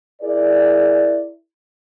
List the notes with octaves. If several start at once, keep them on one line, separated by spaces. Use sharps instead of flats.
E4 G#4 A#4 D5